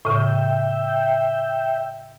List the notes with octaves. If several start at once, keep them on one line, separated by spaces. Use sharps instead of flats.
A2 C#3 E5 G5